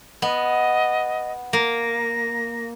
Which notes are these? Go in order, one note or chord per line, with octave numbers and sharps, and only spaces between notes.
B3 D#5
A#3 A#6